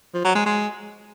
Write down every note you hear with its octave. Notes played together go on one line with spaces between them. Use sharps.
F3
F#3
G#3
G#3